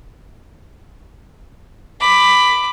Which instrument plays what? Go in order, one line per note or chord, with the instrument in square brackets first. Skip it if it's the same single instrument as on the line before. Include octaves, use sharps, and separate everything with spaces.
[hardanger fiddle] B5 D6